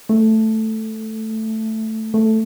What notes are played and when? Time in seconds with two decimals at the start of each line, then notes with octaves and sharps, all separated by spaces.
0.09 A3
2.14 A3